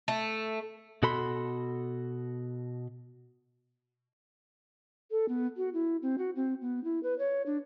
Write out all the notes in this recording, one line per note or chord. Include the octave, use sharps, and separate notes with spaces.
A3
B2 F#4 A4 B5 C6
A4
B3
F#4
E4
C4
F#4
C4
B3
E4
B4
C#5
D4